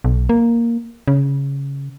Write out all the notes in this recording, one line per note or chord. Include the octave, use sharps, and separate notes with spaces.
B1
A#3
C#3